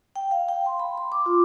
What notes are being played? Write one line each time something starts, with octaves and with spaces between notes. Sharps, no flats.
G5
F5
G5
C6
B5
C6
D6
F4